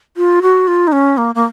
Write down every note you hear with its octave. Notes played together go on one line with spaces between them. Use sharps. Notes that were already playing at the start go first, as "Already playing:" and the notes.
F4
F#4
F4
D#4
C#4
A#3
A#3